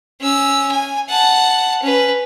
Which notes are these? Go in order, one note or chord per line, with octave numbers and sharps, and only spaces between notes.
C#4 E6
G#5
F#5 A5
C#4 B4